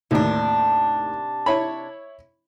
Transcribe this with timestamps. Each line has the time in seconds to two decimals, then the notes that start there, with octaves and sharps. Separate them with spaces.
0.11 D#2 A2 C3 D#3 D4
1.46 E4 C#5 B5